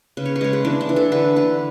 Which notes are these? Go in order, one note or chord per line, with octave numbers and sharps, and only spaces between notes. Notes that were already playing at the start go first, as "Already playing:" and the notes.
C#3 B4
C#5
B4
G#3 C#5
B4
E3 D4
D4
E3
A4
D3 B4
D3 B4